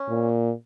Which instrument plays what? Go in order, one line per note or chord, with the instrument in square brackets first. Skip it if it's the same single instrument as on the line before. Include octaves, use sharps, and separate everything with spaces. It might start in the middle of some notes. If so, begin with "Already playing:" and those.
Already playing: [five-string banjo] C#4
[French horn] A#2